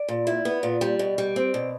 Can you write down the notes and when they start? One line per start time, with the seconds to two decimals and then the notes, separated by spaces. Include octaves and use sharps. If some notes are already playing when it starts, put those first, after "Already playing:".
Already playing: D5
0.08 A#2
0.27 E4
0.45 B3
0.63 A#2
0.81 G3
0.99 B2
1.18 G3
1.36 C4
1.54 B2